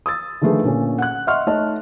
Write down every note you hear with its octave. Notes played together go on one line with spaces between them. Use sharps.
D#6 E6 A6
D3 D#3 F3 A3 G#4 B4
A#2 D3 C#4
F#5 F#6
D#5 E5 F#5 C6 C#6 F6
A3 D#4 C#5 D#5 A5